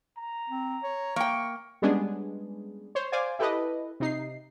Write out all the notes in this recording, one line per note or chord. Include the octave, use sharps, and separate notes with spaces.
A#5
C4
C#5
A#3 G5 C#6
G3 G#3 B3 C#4 D4 G#4
C5 C#5
C5 D5 F5 G#5
E4 G4 A4 B4 D#5
C3 D#4 C7